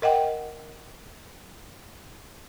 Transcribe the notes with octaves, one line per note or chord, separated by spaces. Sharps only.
A#4 D#5 F#5 G5